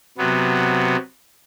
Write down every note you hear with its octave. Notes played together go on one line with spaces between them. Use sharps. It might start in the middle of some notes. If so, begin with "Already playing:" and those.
C3 F#3 B3